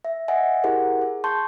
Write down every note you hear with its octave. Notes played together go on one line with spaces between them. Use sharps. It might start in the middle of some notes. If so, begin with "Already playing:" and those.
E5
D#5 E5 F#5 G#5
E4 G4 G#4 A#4 C5 F#5
G#4
A5 C6 C#6 G6